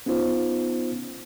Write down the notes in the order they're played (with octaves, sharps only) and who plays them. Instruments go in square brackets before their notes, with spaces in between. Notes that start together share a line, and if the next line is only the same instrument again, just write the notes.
[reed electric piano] B3 C#4 D#4 F4 C5